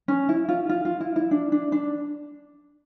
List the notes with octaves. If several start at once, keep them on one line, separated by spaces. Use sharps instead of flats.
C#4
E4
F4
F4
F4
E4
E4
D4
D4
D4